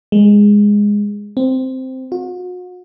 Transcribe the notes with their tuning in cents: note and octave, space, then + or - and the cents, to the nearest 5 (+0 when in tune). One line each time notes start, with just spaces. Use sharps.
G#3 -10
C4 -5
F#4 -40